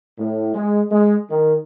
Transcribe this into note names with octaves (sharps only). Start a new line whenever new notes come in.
A2
G#3
G#3
D#3